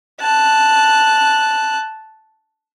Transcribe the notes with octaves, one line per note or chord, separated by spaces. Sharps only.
A5 F#6